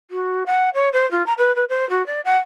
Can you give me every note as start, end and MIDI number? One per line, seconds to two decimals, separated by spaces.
0.11 0.44 66
0.46 0.70 78
0.74 0.89 73
0.93 1.09 72
1.11 1.25 65
1.26 1.33 82
1.38 1.54 71
1.55 1.65 71
1.69 1.88 72
1.90 2.05 66
2.06 2.21 74
2.25 2.38 78